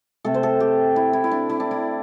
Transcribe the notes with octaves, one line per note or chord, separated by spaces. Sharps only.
C3 A3 A4
C5
A4
G4
E4
E4
E4
D4
E4
D4
E4